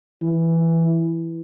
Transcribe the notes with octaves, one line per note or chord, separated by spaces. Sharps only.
E3